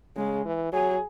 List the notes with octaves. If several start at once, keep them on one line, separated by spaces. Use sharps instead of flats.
C#3 G#3
E3
F#3 G#4